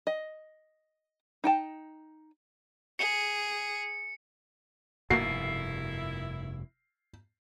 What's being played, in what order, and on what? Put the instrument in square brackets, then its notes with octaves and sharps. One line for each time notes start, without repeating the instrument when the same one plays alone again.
[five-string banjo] D#5
D#4 G5 A5
[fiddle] G#4 [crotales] C#7
[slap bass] F1 G2 B2 [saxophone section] D#3 E4 [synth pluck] A#3 F#4 [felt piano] C7